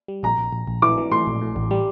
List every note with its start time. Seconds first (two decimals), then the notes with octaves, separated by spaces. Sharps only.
0.08 G3
0.23 A#1 A#5
0.38 A#1
0.53 A#1
0.68 A#1
0.82 E3 D6
0.98 E3
1.11 A2 C6
1.27 A#1
1.41 A2
1.56 A1
1.71 G3